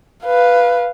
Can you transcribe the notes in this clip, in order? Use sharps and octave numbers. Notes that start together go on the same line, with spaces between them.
B4 F5